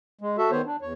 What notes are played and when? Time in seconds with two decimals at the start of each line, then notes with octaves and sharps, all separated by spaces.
0.21 G#3
0.38 F#4 A4 E5
0.51 D#3 B3 C5 C#5
0.66 D4
0.82 E2 C#5